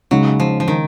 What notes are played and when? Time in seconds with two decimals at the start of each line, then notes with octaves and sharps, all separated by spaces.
0.11 C#3 F#3 G#3 D#4
0.40 F3
0.60 F3
0.68 D#3